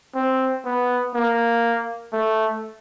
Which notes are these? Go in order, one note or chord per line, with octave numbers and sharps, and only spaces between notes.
C4
B3
A#3
A3